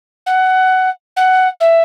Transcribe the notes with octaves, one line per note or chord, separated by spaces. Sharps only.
F#5
F#5
E5